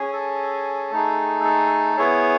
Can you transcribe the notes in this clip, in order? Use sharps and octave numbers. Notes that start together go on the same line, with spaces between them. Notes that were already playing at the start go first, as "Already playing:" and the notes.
Already playing: C#4 G#4
A4
A3 D#4 G#4
A4
B3 E4 G#4 C#5